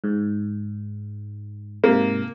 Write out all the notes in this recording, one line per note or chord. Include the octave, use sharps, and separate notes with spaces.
G#2
G#2 C3 A#3